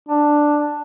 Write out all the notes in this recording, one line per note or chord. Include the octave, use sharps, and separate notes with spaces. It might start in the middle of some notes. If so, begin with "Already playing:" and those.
D4